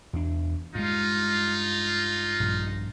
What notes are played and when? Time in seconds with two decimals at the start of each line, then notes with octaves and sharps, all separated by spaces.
0.13 E2 D4
0.75 G2 G#3 D#4 F4
2.40 A#1 G2